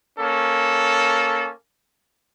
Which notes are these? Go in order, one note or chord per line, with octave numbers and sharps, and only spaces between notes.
A#3 C#4 A4